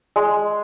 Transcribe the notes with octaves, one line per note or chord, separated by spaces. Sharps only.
G#3